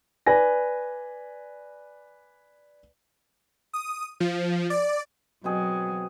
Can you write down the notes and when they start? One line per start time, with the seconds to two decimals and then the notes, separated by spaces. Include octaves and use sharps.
0.26 B4 D5 G#5 A#6
3.73 D#6
4.20 F3
4.70 D5
5.44 B2 F#3 C4 G#4